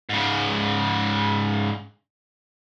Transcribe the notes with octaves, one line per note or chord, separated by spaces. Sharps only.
G#2 C#3